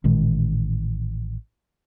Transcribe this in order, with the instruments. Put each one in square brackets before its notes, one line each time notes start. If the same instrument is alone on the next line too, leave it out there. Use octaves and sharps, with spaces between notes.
[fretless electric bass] A1 A#2 D#3 G#3